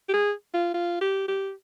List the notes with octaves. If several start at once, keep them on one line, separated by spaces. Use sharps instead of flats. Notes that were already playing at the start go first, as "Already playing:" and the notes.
G4
G#4
F4
F4
G4
G4